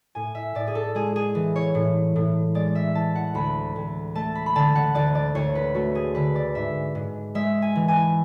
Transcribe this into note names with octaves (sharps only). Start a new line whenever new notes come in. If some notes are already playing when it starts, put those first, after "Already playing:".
A2 G#5
E5
A2 D5
G#4
A4
G#3 G#4
G#4
E3
C#5
A2
A2
G#3 D5
E5
E3 A5
F#5
D2 B5
D2
A3 A5
B5
B5
D3 A5
F#5
D2 D5
D5
D2 C#5
B4
A3 F#4
G#4
D3 B4
D5
G#2 E5
G#2
G#3 E5
G#5
E3
G#5